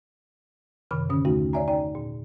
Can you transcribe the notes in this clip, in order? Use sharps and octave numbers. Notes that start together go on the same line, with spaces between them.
F#2 C3 D#3 B5 F6
A2 D3 C#4 D#6
D#2 A3 D#4 F#4
C#5 D5 E5 G#5 A#5
D#4 D5 G5 A#5
A#2